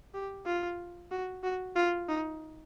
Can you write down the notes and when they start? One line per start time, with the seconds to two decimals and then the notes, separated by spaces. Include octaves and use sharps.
0.14 G4
0.46 F4
1.12 F#4
1.43 F#4
1.76 F4
2.09 D#4